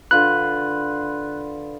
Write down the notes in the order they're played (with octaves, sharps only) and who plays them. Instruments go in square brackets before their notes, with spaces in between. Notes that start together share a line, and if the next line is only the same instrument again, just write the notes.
[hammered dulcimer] D3 F4 B4 [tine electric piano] F#6